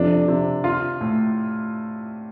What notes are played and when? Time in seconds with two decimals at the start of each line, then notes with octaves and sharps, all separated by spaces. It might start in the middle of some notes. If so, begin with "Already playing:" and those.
Already playing: F2 C3 D4
0.28 C3
0.64 F4
1.01 A2